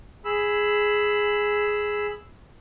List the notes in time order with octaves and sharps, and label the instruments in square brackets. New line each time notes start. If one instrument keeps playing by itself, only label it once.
[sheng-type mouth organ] G#4 B5 E6